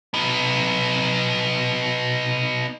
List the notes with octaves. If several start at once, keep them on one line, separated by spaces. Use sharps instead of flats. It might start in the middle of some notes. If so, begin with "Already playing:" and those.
B3 D#4